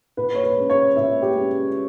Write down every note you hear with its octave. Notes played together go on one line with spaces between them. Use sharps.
A#2 B4
C#5
B4
G#3 C#4
C#5
A#2 E5
G4
G#3 C#4